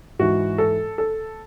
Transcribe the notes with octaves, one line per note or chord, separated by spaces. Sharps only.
G#2 E3 F#4
A4
A4